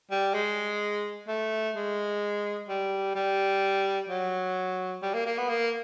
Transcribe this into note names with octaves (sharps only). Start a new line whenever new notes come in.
G3
G#3
A3
G#3
G3
G3
F#3
G3
A#3
A#3
B3
A#3